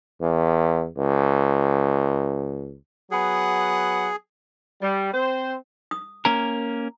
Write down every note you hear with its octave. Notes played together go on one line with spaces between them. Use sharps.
E2
C#2
F#3 B3 G#4 F#5
G3
C4 C5
D#6
A#3 C#4 A#4 A#5